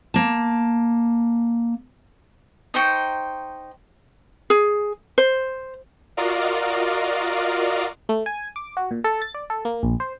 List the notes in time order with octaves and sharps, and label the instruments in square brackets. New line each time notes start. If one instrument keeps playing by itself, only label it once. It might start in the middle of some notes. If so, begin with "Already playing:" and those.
[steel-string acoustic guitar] A#3 A5
[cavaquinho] D#4 C5 G5 C#6
[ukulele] G#4
C5
[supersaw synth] F4 F#4 A#4 D5 D#5 F5
[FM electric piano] A3
G#5
D6
F#4
A#2
A4
A6
D5
A4
A#3
A#1
C5